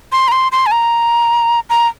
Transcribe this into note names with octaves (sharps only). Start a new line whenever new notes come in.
C6
A#5
C6
C6
G#5
A#5
A#5